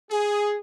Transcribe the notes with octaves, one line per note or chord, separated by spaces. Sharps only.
G#4